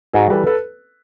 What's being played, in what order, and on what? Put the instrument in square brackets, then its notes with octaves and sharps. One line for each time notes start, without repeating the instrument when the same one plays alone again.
[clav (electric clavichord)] G#2 [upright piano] F#4 G#4
[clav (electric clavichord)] E3 G3 [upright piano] A4 B4
[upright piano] A4 B4